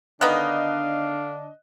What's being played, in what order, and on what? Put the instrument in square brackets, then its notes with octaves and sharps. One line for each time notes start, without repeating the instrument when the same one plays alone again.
[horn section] D3 D4 [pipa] D#3 B3 D#4 [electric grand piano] D#5 F#6 [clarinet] F5